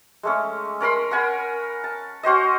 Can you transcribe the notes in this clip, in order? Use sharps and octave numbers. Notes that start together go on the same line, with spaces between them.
G#3 A3 C#4
C#4 A#4 B5 C6
A#4 F#5 G#5 B5
A5
C#4 F#4 C5 D#5